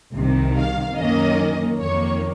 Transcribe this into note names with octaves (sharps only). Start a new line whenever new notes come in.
C2 C3 D#3
F5
F#2 D#3 A#3 C#4 D#5
F2 D#3 A#3 C#5